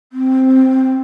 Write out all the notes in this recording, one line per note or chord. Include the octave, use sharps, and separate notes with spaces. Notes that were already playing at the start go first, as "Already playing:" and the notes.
C4